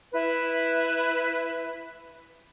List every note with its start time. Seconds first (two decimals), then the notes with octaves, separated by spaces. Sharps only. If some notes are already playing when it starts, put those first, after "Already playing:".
0.12 E4 B4